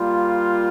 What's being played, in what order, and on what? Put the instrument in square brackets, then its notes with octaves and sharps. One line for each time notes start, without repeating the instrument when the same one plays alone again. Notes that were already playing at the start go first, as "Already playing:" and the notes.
Already playing: [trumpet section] G3 A#3 F4